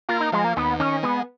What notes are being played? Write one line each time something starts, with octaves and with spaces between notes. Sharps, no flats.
A#3 F4
D#4
F3 G#3
A#3
D#2 B3
D#3 C#4
G#3 B3